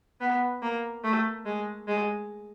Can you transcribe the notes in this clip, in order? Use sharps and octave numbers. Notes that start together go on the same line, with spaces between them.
B3
A#3
A3
G#3
G#3